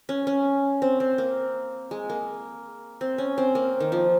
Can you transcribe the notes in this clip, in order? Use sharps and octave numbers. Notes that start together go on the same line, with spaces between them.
C#4
C#4
C4
C4
A#3
G#3
A#3
C4
C#4
C4
A#3
D#3
F3